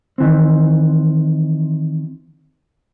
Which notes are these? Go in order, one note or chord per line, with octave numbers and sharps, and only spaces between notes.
D#3 E3 C4